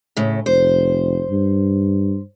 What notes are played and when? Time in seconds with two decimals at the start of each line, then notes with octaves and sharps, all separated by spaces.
0.17 A2 C#3
0.46 F1 C5
1.30 G2